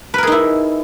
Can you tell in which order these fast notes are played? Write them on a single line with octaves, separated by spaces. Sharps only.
B4 A#4 G#4 D#4 E4